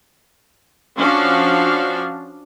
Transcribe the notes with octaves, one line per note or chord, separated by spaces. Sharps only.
F3 C#4 D4 F#4 F5